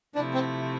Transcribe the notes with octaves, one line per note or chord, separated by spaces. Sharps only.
C3 F3 A3 D4 E4
C4